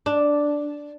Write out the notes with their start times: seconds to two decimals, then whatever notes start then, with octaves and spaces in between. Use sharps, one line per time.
0.06 D4